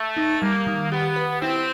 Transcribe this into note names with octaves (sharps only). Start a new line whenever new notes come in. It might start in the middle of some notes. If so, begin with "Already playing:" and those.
Already playing: A3
D#4
G3 A#3
D#3
B3 G4
B4
C4 E4